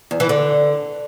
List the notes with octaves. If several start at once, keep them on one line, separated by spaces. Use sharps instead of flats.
E2
E3
D3